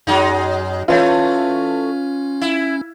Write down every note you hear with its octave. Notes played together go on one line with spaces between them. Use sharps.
F#2 F#3 G#3 D#4
E3 A3 C#4 F4 B4 C#5
E4